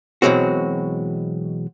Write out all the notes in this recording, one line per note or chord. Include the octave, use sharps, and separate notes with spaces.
B2 E3 F#3 G#3 C4 F#4